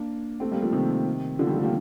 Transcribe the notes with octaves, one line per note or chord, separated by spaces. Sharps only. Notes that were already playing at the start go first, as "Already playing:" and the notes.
Already playing: A#3 D4
A3 C4
G3 A#3
F3 A3
C3 D#3
D3 F3
D#3 G3
F3 A3
G3 A#3